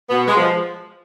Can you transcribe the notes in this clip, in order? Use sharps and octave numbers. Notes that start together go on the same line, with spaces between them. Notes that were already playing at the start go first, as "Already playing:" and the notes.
B2 B3
G#3
F3